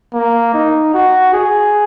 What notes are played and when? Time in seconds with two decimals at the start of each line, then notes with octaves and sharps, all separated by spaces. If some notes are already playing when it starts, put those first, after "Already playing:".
0.14 A#3
0.54 D#4
0.94 F#4
1.34 G#4